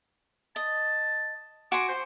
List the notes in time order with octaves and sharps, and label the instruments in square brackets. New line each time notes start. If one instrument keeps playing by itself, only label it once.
[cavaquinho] D#5 [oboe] A5
[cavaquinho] F#4 G#5 C6 [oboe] D6
[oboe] C5